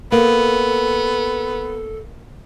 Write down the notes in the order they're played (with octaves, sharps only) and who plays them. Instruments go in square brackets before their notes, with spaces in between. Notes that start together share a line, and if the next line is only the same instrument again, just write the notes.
[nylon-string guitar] A#3 [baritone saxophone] B3 [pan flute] A4